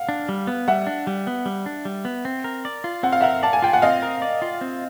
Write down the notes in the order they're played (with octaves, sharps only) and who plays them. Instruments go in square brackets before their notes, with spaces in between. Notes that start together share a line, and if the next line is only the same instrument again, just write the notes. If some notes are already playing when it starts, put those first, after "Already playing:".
Already playing: [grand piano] F5 F#5
[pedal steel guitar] D4
G3
B3
[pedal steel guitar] G3 [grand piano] E5 F#5
[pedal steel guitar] D4
G3
B3
G3
D4
G3
B3
C4
A#4
D5
F4
[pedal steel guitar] C4 [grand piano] F#5
[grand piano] F5
[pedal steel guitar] A#4 [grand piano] E5 F#5
[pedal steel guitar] D5 [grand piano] A5
[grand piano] G#5
[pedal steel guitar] F4 [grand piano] G5
[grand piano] F#5
[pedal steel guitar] C4 [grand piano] D#5 F5
[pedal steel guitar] A#4
D5
F4
C4